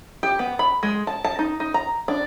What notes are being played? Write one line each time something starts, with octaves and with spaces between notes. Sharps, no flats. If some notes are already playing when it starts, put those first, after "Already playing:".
G4
B3
B5
G#3
A5
A5
D#4
D#4
A#5
D4